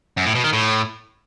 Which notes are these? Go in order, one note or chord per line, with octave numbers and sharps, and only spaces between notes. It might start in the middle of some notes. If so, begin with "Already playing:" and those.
F#2
A2
B2
D#3
A2